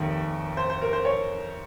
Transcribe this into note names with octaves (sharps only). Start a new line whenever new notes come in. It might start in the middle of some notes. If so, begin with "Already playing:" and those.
Already playing: F1 D#2 D#3
C5
C5
A#4
C5
C#5